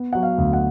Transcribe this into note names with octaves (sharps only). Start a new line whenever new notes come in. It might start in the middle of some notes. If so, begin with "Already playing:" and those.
Already playing: B3
F#3 F#5
F5
D2
F#5